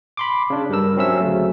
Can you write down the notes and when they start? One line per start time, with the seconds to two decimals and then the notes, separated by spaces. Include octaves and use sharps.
0.17 B5 C6 D6
0.50 C#3 D4
0.69 G2 G3 D4 A#4 E6
0.97 F#3 C4 C#4 E5 E6
1.21 D2 C#3 F#3 A3